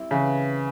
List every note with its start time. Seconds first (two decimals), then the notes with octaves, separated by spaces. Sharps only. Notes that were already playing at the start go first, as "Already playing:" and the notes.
Already playing: G3 C4 E4
0.11 C#3 E3